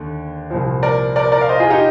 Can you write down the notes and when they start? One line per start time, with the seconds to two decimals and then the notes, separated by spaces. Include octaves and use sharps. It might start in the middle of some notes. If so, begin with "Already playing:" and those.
Already playing: D#2 D3
0.50 C2 A#2 F3
0.83 A#4 D5
1.16 A#4 D5
1.32 A#4 D5
1.41 F5
1.49 C5 D#5
1.60 F4 G#4
1.70 D#4 G4